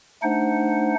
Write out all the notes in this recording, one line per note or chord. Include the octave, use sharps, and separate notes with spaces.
A3 D4 D#4 C5 F#5